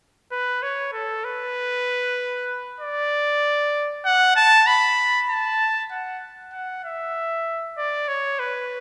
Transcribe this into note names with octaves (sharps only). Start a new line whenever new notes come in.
B4
C#5
A4
B4
D5
F#5
A5
B5
A5
F#5
F#5
E5
D5
C#5
B4